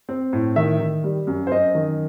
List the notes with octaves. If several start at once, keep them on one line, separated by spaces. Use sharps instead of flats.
C4
A2
D#3 E5
D#3
G3
F#2
C5
F#2 D#5
D#3